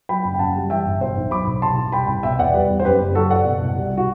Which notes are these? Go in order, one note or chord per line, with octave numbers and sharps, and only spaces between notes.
F#3 G5 B5
F#1
G5
F#2 F#5 A5
G3
E3 E5 G5
G1
B2 C5 E5
B1
F#3 B5 D6
B1
C3 A5 C6
C2
G3 G5 B5
C2
B2 E5 G5
E2 D5 F#5
G3 B4 D5
E2
C5
F#2 G4 B4
F#1
F#3 F#4 A4
F#1 D5 F#5
B2
C2
G3
F#4